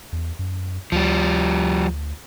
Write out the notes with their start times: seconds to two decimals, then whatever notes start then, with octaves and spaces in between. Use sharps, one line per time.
0.12 E2
0.39 F#2
0.92 D2 F3 G3